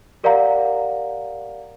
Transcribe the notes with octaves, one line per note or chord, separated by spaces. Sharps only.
G4 A#4 D5 F5 F#5 A#5